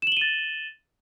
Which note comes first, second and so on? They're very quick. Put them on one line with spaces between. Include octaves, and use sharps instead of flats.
E7 F#7 G7 D#7 A6